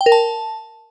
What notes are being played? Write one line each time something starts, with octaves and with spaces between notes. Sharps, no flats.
G5
A#4
A5